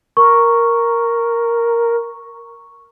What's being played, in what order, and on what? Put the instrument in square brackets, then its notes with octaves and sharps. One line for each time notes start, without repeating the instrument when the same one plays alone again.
[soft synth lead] A#4 [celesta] C#6